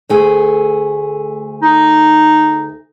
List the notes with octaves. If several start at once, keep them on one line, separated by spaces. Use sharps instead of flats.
D2 A3 G#4
D#4